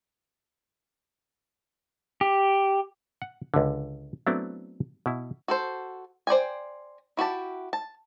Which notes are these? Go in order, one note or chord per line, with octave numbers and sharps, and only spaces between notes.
G4
F#5
C#2 D3
F#3 A3 B3 C4 D4 E4
B2 E4
F#4 A4 C5
C5 D5 G5 G#5
E4 F#4 G4 A5
A5